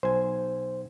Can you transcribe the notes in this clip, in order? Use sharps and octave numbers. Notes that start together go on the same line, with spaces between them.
B1 C5 G#5